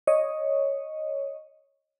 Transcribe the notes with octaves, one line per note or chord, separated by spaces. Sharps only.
C#5 D#5